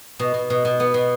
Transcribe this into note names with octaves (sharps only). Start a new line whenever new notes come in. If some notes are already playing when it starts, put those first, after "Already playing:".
B2
B2
B2
B2
B3
B2